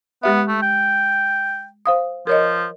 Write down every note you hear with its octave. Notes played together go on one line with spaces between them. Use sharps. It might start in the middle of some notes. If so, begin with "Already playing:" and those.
G#3 B3 G4 E5
A3
G5
C5 F5 D#6
F3 A#4 C#5 D#5